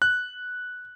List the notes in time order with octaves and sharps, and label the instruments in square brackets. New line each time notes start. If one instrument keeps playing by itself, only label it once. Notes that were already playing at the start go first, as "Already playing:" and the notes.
[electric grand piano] F#6